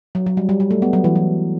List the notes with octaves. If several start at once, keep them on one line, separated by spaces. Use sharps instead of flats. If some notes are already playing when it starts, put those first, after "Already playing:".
F#3
F#3
G3
G3
G3
A3
B3
F#3
E3
F#3